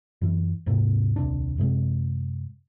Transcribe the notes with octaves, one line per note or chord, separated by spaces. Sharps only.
F#2 E3
D#1 G#2 C3 A#3
D#1 C2 D4
F#2 C3 G#3